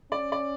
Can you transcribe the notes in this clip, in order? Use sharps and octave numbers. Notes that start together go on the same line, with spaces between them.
C#4 D5
D5